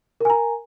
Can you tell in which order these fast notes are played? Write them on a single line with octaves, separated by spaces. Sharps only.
A#4 G#5 A#5